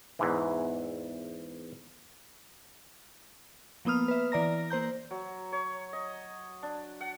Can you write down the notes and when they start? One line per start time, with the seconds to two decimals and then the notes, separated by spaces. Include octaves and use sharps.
0.19 E2 G#2 E3
3.85 F3 A#3 B3 D#6 F6
4.08 B4 E5
4.32 E3 D5 A#5 A#6
4.70 A#3 C5 A#5 G6
5.11 F#3
5.52 C#5
5.93 D#5
6.63 D4
7.01 F#5